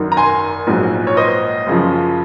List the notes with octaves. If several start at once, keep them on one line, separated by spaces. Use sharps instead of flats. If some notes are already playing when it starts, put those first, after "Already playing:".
Already playing: G#1 F#2 D#3
A#5
G#5 C6
A#1 G#2 F#3
C#5
C5 D#5
F#2 C#3 F3